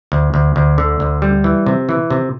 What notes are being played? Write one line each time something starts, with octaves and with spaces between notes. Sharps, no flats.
D2
D2
D2
D3
D2
G3
E3
C3
E3
C3